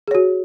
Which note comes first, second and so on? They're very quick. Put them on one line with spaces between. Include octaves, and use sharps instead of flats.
G#4 C#5 F#4